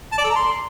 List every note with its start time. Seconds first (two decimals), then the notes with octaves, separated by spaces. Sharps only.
0.12 A5
0.18 D5
0.24 A4
0.30 A#5
0.36 C6